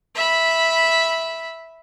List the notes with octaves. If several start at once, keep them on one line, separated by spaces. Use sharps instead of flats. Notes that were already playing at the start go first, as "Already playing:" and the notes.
E5 B5